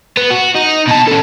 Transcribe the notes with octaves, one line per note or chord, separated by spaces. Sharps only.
B3
F#4
D#4
B2 A5
C#4 A4